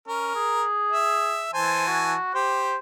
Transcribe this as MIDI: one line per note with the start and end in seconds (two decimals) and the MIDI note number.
0.08 0.34 61
0.08 0.64 70
0.35 1.46 68
0.91 1.49 76
1.53 2.16 52
1.53 1.84 72
1.53 2.16 80
1.53 2.16 81
1.87 2.32 66
2.34 2.76 67
2.34 2.76 72